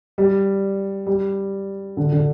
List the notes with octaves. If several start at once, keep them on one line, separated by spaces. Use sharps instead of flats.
G3
G3
D3
D3